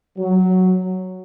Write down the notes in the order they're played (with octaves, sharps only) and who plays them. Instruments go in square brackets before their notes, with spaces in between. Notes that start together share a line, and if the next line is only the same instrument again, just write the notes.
[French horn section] F#3